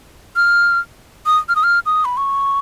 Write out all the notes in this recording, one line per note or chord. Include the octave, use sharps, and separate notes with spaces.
F6
D#6
F6
D#6
F6
D#6
B5
C#6